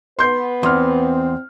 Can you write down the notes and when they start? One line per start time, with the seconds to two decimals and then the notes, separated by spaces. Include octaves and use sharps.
0.19 B3 B4 C6 G6 C7
0.63 E2 C4 C6 F6